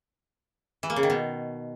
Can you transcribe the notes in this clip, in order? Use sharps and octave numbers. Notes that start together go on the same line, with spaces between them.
E3
A#3
C#3
D#3
B2